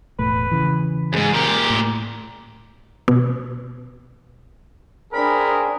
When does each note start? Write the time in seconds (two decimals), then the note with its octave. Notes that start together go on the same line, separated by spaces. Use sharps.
0.19 E1 A2 A3 B4
0.51 C#3 E3
1.13 F2 G#2 G#4
1.33 A#2 G4 A#4
1.70 A2
3.08 B2
5.14 D4 G#4 A#4 C5 G5 B5